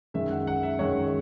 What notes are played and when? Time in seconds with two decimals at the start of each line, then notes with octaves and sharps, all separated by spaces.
0.14 F#2 D#3 G#3 E5
0.30 F#5
0.47 F#5
0.63 E5
0.79 F#2 D#3 G#3 C#5